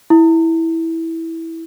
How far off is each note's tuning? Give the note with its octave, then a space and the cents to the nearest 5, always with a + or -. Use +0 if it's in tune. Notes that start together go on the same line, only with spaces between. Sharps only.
E4 -10